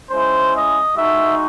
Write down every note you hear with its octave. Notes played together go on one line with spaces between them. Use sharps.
G#3 C#4 E4 C5
D#5
G#3 D#4 F#4 E5